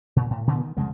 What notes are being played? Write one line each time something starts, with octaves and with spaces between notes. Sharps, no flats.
A#2
A2
A#2 D3 E3 B3
D#3
C2 F2 C#3 G#3